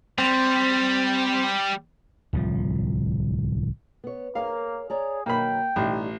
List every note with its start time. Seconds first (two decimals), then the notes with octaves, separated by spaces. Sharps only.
0.18 G3 C4
2.33 D1 C2 F3
4.04 B3 C#5
4.35 A#3 G#4 A#4 C#5 F5
4.90 G#4 C#5 D5 A#5
5.26 B2 D#3 F#3 A#3 G5 B5
5.76 A1 B2 G3 D#4